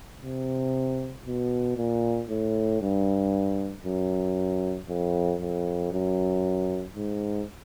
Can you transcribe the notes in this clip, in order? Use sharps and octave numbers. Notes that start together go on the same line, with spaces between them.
C3
B2
A#2
A2
G2
F#2
F2
F2
F#2
G#2